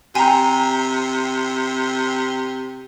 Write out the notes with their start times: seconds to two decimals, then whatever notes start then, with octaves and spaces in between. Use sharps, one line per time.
0.15 C3 G5 G#5 A#5